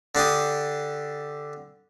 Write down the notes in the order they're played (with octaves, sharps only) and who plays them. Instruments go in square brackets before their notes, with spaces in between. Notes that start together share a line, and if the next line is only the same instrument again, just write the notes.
[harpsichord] D3 D4 G4 D#6